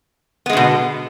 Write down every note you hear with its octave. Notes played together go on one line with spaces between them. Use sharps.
B2 D3 G#3 B3